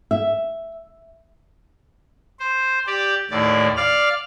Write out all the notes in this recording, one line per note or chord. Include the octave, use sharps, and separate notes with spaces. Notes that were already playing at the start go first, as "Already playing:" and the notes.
E5
C5
G4 D5
D#2 A2 D5
D5 F5 F6